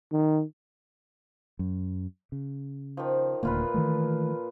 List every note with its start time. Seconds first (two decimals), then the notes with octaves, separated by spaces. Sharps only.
0.12 D#3
1.59 F#2
2.32 C#3
2.97 D#3 F3
3.43 D#1 D2 A#2 A#3 F4 B4
3.74 D#3 E3 A3